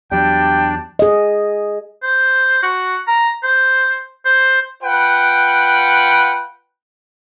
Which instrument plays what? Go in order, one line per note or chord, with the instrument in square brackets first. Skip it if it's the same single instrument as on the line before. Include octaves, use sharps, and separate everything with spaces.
[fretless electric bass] E2 F#3 [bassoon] G3 [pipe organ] D4 [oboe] G5
[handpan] G#4 D#5
[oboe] C5
F#4
A#5
C5
C5
[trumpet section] F4 B4 F#5 G5